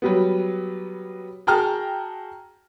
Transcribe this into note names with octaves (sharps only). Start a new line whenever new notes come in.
F#3 G3 B3
F#4 G#4 G5 A5 A#5 F6